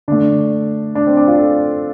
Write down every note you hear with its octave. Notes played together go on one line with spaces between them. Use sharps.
D3 A3 D4
D4
C4
D4
F4
A4